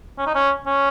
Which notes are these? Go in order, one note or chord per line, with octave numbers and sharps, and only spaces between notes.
C#4
D#4
C#4
C#4